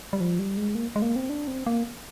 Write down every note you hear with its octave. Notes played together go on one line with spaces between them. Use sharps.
G3
F3
G3
G#3
A#3
G#3
A#3
C4
D4
C4
A#3